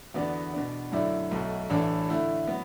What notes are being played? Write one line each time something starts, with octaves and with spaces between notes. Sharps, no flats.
E2 D3 B3 F#4 D5
B2 B3 D4
F#2 D3 A3 E4 D5
B1 B2 A3
A1 A2 E3 D4 A4
D3 A3 E4
F#3 B3